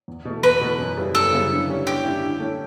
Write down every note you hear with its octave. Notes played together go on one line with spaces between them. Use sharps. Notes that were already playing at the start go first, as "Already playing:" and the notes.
E2
B2 A3
E2 B4
B2 A3
F#2
C#3 G3 B3 E4
F#2 A4
C#3 G3 B3 E4
D3
G3 C#4 E4
D3 G4
G3 C#4 E4
D3
A3 C#4 E4